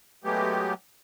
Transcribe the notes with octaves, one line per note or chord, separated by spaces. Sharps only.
F#3 G#3 A3 B3 G4